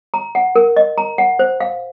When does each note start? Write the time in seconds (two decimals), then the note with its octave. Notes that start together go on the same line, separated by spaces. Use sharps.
0.14 A#5
0.35 F#5
0.56 A#4
0.76 D#5
0.98 A#5
1.18 F#5
1.39 C5
1.60 F5